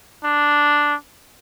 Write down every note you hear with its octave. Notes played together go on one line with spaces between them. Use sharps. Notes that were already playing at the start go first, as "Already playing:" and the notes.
D4